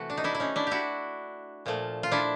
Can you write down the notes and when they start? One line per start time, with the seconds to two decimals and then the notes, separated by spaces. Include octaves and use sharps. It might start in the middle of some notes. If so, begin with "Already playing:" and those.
Already playing: C3 E3 A3 F#4
0.10 D4
0.17 D#4
0.24 D4 E4
0.35 E4
0.40 C#4 D#4
0.56 D4 E4
0.67 E4 F#4 G4
1.66 A#2 F3 A3
2.03 F4
2.12 D4 E4